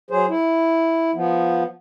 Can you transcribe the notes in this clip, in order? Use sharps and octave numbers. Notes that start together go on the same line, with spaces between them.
F#3 G#4 C5
E4
F3 B3